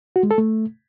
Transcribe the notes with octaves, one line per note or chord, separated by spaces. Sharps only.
F#4
G#3
A4
A3